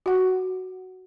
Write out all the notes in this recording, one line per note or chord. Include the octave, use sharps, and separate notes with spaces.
F#4 F#5